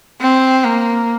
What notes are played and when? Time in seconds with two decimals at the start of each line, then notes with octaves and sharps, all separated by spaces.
0.21 C4
0.64 A#3